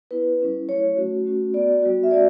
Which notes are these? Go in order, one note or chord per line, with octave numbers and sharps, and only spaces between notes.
B3 E4 B4
G3 C#4 E4
F#3 A3 E4 C#5
A3 C#4 F#4
A3 C#4 F#4
B3 F#4 D5
G3 B3 F#4
E5
A3 C#4 F#4 D5